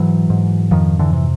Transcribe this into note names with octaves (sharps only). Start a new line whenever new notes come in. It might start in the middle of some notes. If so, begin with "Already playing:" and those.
Already playing: G#2 E3 F#3
G#2
F2 D#3 F3
D3 E3
C3